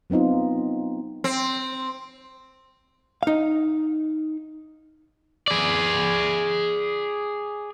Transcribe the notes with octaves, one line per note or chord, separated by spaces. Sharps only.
F#3 B3 C4 D#4 F4
C4
D#4 F5
G#4 D5